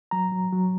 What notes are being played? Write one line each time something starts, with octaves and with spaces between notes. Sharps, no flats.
F#3 A#5
F#3
F#3